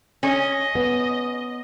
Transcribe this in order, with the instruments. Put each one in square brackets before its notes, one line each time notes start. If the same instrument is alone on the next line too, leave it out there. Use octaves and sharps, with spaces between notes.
[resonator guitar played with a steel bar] C#4 [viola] D#5
[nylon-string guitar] B3